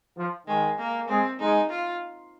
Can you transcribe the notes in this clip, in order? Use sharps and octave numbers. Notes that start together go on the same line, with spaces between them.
F3
D#3 G#3
A#3
G#3 C4
G#3 D#4
F4